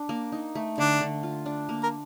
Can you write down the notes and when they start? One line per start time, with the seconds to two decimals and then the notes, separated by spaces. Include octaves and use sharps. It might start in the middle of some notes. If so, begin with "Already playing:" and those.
Already playing: D4
0.09 A#3
0.32 D#4
0.55 A3
0.78 D3 D4
1.01 D3
1.23 F4
1.46 D4
1.69 A#3
1.83 A#4